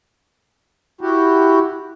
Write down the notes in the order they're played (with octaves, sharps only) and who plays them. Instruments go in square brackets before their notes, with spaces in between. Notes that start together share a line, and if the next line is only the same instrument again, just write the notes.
[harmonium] E4 F#4 G4